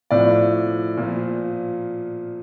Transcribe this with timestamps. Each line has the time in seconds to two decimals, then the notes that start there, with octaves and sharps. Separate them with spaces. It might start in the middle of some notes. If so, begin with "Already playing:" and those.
0.11 A2 F3 D5
0.97 A#2 F3